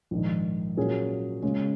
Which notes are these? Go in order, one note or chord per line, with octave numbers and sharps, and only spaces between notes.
A#1 G#2 D#3
A#2 F#3 C#4 G#4
C#3 G#3 C#4